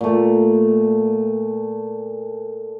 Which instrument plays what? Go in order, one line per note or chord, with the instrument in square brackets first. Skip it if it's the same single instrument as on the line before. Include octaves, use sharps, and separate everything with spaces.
[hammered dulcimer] A#2 A3